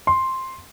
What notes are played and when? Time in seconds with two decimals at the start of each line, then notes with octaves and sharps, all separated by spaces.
0.07 C6